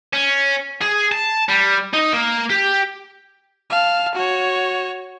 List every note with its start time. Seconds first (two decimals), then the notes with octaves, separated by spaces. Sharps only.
0.13 C#4
0.82 G#4
1.12 A5
1.49 G3
1.93 D#4
2.13 A#3
2.50 G4
3.70 F5 A5
4.15 F#4 C#5